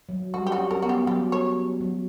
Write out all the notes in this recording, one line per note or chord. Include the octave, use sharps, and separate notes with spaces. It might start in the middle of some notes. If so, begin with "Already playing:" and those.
F#3
G3 F#4
G4
F#4
C#4
C#4 A#4
B3 F#4
G4
F#3 G4
C#5
F#3